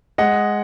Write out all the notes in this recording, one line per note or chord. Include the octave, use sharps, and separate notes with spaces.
G#3 D#5 F#5